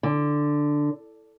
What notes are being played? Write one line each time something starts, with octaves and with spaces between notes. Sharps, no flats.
D3